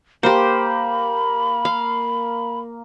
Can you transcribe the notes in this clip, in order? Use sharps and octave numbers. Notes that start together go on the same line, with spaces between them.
A#3 G4 C5 B5
F5